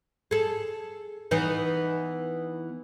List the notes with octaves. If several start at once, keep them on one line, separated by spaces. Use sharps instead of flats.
G#4 A4
E3 B3 D#4